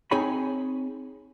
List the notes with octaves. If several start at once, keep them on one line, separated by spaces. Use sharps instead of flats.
C4 D#4 G#4 C#5 G#5 B5